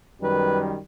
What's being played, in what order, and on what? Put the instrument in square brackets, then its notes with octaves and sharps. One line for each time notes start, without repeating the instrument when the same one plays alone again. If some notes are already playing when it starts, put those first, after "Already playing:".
[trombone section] F#2 D#3 G3 B4